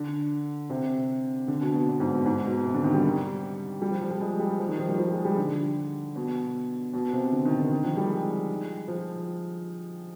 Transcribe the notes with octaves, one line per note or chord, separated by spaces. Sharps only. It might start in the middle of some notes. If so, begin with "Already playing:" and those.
Already playing: D3
C3
D3
B2
B2
B2
G#2
B2
G#2
B2
C3
D3
D#3
G3
G3
F3
F3
G3
G#3
G3
F3
D#3
F3
G3
F3
G#3
G3
D3
B2
B2
C3
D3
D#3
D3
D#3
F3
G3
G#3
F3